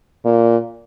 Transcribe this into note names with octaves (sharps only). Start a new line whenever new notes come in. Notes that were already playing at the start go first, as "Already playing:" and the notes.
A#2